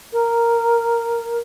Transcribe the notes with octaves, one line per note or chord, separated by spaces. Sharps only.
A#4